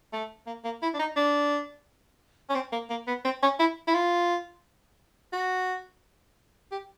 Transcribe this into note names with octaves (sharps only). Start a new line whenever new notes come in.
A3
A#3
A#3
E4
D4
D#4
D4
C#4
C4
A#3
A#3
B3
C4
C#4
E4
E4
F4
F#4
G4